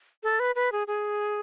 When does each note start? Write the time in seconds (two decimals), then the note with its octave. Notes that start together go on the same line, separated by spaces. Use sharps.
0.23 A4
0.40 B4
0.55 B4
0.72 G#4
0.87 G#4